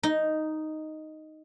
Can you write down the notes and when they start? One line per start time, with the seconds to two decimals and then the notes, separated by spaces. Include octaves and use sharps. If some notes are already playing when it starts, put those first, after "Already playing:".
0.03 D#4